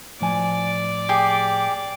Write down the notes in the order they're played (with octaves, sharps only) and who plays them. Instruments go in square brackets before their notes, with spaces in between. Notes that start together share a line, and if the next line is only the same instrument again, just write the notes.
[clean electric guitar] A2 F3 G#5 [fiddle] D5
[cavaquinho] G4 G#4